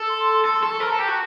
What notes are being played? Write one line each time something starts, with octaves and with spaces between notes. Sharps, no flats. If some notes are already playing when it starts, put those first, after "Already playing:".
Already playing: A4
C6
A4 C6
C#6
A4
C#6
A#4 A5
A4
G4
F#4